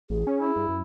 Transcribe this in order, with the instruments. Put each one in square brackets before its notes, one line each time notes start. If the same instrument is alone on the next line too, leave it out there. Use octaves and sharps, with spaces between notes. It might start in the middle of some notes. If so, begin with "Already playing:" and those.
[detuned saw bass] A1 [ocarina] G#4
[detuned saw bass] C#4
[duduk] E4
[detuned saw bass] G2
F#2